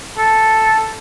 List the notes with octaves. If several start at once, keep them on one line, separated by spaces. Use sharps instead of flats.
A4